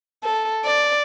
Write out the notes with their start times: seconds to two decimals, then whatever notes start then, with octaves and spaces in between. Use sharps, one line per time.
0.24 A4
0.66 D5